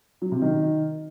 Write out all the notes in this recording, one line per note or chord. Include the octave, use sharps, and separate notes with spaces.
F#3
C3
D#3